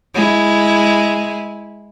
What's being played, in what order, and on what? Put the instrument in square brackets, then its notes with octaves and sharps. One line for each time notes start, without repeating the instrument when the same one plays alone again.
[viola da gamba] G#3 E4